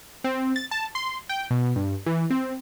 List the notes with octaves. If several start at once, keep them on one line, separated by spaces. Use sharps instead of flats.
C4
A6
A5
C6
G5
B2
G2
E3
C4